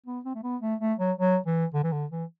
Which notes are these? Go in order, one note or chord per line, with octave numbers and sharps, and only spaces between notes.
B3
C4
A3
B3
A3
A3
F#3
F#3
E3
D3
E3
D3
E3